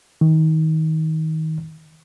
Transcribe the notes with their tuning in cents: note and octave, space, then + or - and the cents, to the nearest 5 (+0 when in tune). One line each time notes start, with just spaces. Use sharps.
D#3 +30